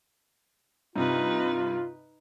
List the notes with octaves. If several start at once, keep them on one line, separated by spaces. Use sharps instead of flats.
G2 C3 D#4 F4 B4